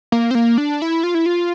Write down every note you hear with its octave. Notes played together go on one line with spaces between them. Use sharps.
A#3
C4
A#3
D4
E4
F4
E4
F4